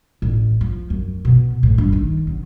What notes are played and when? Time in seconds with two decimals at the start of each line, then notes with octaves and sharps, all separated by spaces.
0.22 A1
0.61 F3
0.90 F#2
1.25 B2
1.63 A2
1.78 G2
1.92 D#3
2.27 F#2